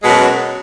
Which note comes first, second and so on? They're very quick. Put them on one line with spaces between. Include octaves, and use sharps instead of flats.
G#3 B2 F#2 F#3